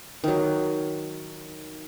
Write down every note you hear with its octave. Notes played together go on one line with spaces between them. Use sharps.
D#3 F#3